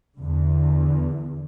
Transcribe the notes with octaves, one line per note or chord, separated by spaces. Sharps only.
E2 D3